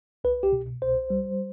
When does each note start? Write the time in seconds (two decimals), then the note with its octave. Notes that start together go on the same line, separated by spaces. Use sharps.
0.24 C2 B4
0.43 G4
0.52 B2
0.82 C2 C5
1.10 G3